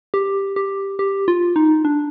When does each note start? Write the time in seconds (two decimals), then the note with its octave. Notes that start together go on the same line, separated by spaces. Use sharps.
0.14 G4
0.56 G4
0.99 G4
1.28 F4
1.56 D#4
1.85 D4